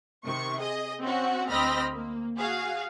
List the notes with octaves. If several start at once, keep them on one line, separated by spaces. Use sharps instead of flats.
C3 D#3 C#6
G#4 D#5
C4 C#4 F#4
D2 C4 D#5 B5 F6 A#6
A#3
F#4 G#4 F5